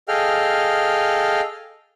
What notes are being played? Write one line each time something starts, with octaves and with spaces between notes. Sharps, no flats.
G#4 A4 D#5 F5 G5 F6